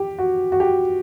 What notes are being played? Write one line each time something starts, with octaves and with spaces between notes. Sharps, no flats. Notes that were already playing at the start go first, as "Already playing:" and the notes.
Already playing: G4
F#4
F#4
G4